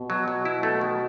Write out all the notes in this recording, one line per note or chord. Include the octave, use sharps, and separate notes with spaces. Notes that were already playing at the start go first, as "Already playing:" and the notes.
Already playing: B2
F#3
F#3
E4
A3
D#3